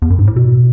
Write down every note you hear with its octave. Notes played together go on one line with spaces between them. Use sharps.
E2
F#2
G#2
A2
B2